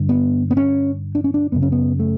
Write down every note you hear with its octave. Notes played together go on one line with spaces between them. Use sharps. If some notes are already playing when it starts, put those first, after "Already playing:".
Already playing: G2 D3
B3
B3
C#4
D4
C#4
D4
F#2 C#3 B3
C#4
B3
A3